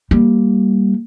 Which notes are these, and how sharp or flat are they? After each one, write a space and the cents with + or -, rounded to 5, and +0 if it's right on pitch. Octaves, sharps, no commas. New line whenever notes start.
G3 +0 A#3 +0